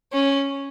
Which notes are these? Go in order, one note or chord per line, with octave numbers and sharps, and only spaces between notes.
C#4